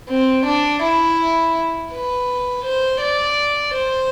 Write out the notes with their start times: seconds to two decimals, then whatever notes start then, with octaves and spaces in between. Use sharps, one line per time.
0.09 C4
0.45 D4
0.82 E4
1.92 B4
2.64 C5
3.01 D5
3.74 C5